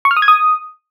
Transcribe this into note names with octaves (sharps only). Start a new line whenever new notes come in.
C#6
F6
D#6
G#6
D#6